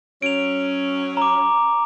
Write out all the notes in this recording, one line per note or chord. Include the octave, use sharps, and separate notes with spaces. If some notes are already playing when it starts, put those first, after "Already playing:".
F#3 C#4 D7 F7
A#5 D6